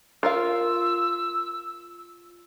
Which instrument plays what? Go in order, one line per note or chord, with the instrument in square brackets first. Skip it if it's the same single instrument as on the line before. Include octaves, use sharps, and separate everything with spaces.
[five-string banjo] F4 A#4 F5 [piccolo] E6